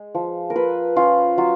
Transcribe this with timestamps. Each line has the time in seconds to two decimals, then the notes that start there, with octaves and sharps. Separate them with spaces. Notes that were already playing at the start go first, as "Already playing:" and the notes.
Already playing: G#3
0.15 F3
0.50 A#4
0.55 F4 B4
0.96 C#4 F4
1.38 F#3 F4